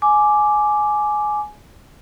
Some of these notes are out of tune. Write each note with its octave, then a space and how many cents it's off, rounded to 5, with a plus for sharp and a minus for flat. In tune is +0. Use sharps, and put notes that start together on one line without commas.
G#5 +15 D6 +0